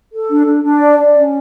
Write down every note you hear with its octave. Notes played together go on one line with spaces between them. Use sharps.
A4
D4
D4
D4
D5
D5
C#4